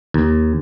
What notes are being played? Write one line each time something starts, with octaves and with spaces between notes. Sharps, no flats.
D#2